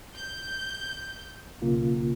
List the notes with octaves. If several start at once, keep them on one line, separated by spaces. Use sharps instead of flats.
G6
B1 C#3 A#3 F4